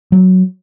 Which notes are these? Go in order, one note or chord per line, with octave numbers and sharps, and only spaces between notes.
F#3